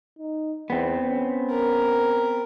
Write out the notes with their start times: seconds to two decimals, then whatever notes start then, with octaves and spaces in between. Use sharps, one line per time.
0.19 D#4
0.70 E2 B3 C4
1.05 C#4
1.51 A#4